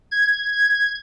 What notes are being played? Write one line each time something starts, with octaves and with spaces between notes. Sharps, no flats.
G#6